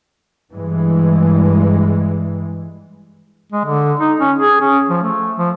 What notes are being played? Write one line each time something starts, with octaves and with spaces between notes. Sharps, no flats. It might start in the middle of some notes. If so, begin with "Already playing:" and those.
G2 E3 G#3
G#3
D3
D#4
C#4
G#4
C#4
F3
A3
F3